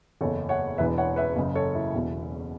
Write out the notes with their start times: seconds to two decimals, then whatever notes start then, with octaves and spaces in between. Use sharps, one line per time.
0.21 F#1 E2 C#3 A4 C#5
0.49 C#5 F#5
0.78 E1 E2 E3 B4 E5
0.98 C#5 F#5
1.16 B4 E5
1.36 F#1 F#2 C#3
1.55 A4 C#5
1.75 E4
1.94 E1 E2 B2